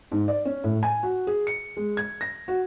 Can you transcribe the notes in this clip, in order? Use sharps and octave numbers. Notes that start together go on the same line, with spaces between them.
G#2
D5
C#4
A2
G#5
F#4
G#4
C#7
G#3
G#6
A#6
F#4